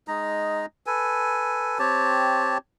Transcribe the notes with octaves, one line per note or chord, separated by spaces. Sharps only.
G#3 D#4 A#5
A4 B4 G#5
C4 G4 C#5 A5